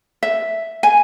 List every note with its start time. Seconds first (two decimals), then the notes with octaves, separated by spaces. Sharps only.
0.23 E5
0.83 G#5